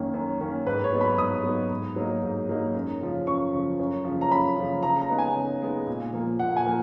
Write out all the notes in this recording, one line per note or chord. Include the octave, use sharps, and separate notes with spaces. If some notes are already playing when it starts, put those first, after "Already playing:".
Already playing: F#2 D#3 A#3 C#4
F#2
D#3 A#3 C#4
G#2 B4
C#5
F#3 B3 D#4
B5
G#2 D#6
F#3 B3 D#4
G#2
F#3 A#3 D#4
G#2
F#3 A#3 D#4
F#2
C#3 F3
F#2 C#6
C#3 F3
F#2
C#3 F3
A#5
F#2 B5
C#3 F3
C#3 A#5
A#5
G#3 B3 D#4
G#5
C#3
G#3 B3 D#4
A#2
F3 A#3
A#2 F#5
G#5
F3 A#3